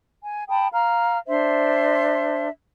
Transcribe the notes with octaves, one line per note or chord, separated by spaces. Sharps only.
G#5
G5 A5 B5 D#6
F5 A#5 F6
D4 C5 E5 C6